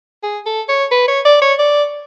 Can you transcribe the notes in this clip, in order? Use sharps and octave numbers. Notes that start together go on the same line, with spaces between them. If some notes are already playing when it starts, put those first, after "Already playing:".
G#4
A4
C#5
B4
C#5
D5
C#5
D5